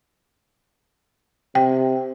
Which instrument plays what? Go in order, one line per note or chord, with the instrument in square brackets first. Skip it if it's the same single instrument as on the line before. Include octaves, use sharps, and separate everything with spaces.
[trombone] C3 [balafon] G5